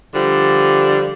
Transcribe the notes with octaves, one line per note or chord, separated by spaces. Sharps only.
D3 F3 G3